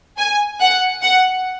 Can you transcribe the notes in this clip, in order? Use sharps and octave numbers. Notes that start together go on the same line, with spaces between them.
G#5
F#5
F#5